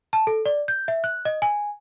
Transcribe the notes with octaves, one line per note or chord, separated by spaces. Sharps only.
A5
A4
D5
G6
E5
F#6
D#5
G#5